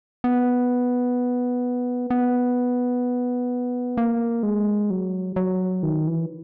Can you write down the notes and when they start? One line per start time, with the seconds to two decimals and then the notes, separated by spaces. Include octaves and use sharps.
0.24 B3
2.11 B3
3.98 A#3
4.43 G#3
4.90 F#3
5.36 F#3
5.83 D#3
6.07 E3